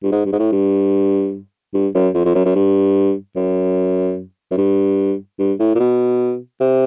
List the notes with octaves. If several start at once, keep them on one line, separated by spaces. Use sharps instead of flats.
G2
G#2
G2
G#2
A2
G2
G2
F#2
F2
F2
F#2
F#2
G2
F#2
F#2
G2
G2
A2
A#2
B2
C3